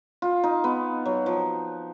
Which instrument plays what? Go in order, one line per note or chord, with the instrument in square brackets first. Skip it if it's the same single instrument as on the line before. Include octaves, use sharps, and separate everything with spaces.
[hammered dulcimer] F4
D#4
B3
F#3
F3